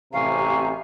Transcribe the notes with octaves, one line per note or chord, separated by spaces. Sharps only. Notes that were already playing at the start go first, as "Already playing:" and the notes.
A1 C3 F5 G#5 A#5 C#6